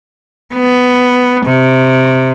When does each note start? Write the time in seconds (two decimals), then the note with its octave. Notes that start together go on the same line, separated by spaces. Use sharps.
0.55 B3
1.45 C3